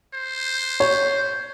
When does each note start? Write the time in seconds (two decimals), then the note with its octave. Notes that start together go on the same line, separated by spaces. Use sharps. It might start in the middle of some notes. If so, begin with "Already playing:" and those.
0.14 C5
0.80 C#5